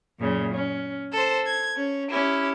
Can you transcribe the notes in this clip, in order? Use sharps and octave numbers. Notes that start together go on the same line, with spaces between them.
F#2 A#2 C#3
C#4
A4 C5
G#6
C#4
C#4 E4 G4